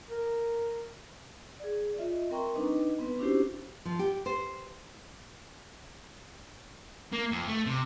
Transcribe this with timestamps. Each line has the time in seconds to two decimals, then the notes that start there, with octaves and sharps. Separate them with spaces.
0.08 A#4
1.60 G#4 D5
1.98 F4 D#5 E5
2.30 C4 A#4 G5 A#5 C6 C#6
2.54 G3 D4 D#4 B4 D#5
2.99 B3 C4 B4
3.19 C#4 D4 E4 F#4 G4 C5
3.85 F3
3.99 G4
4.26 C5
7.13 A#3
7.32 F2
7.48 A3
7.66 C3